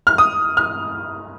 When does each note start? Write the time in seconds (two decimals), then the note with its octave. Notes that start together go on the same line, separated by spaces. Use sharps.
0.07 F6
0.18 D#6
0.57 F6